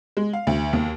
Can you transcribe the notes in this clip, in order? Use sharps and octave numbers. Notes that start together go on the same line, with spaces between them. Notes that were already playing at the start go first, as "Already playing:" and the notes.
G#3
F5
D2
D#2